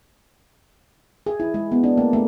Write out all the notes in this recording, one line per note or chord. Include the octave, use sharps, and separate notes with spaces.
G#4
E4
G#3
B3
D4
A#3
A3